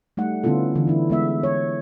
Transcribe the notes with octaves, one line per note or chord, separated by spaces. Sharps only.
G3 A3 D#4 F#5
D3 B3 C#4 E4 F4 A4
D3 E3
E3 E4
G#3 B3 E5
C#5